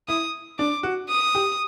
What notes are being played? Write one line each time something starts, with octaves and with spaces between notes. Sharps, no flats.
E4 D#6
D4 D6
F#4
D#6
G4